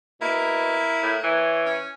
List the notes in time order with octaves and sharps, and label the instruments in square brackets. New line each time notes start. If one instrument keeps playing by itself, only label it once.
[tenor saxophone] B2 [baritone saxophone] A#3 [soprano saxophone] E4
[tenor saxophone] A2
[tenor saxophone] E3 [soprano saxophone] C#5
[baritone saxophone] C#4